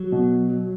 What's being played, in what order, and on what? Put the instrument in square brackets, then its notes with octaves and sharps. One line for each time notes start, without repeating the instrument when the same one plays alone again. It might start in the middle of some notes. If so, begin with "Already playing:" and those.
Already playing: [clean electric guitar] F#3
[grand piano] B2